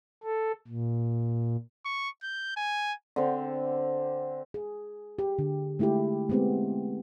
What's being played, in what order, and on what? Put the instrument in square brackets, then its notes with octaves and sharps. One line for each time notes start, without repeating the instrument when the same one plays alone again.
[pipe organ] A4
A#2
[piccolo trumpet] C#6
G6
G#5
[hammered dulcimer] D3 C4
[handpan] G#4
G4
D3
G#3 A3 E4 F4 G4
G#3 A3 B3 C4 G4